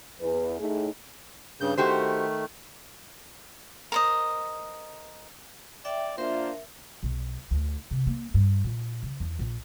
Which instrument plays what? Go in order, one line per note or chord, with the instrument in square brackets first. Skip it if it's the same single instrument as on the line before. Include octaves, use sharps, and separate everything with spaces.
[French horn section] E2 B4
A2 D#4 G#4
[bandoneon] G2 C#3 G6
[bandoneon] D#3 A3 [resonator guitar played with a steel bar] F#4 G4 C5
[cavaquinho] A#4 C5 D#5
[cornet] D5 [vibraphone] E5 G5
[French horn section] A#3 D4 F4 [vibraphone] A#4 E5 [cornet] C5
[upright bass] B1
D2
C3
A#3
G2
A#2
C#3
E2
A#1